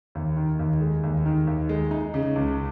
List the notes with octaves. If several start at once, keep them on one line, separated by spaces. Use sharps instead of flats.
D#2
D#3
D#2
G#3
D#2
D#3
D#2
G#3
D#4
C#3
C#2